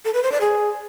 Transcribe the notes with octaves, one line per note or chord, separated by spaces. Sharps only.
A4
B4
C5
D5
G#4